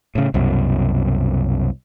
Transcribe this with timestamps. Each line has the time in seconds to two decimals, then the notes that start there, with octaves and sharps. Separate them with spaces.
0.15 A2 C#3
0.34 C2 F#2 B2